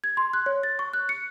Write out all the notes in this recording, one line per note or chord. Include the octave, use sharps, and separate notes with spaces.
G#6
C6
F#6
C#5
A6
C#6
F#6
C#7